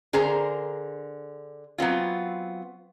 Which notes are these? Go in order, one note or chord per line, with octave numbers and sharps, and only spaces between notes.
D3 G#4 A#4 C5 A#5
F#3 B3 C4 F4